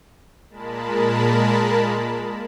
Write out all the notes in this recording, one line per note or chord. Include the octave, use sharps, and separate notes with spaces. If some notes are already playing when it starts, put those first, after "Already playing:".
A#2 G#3 A#4 A5 B5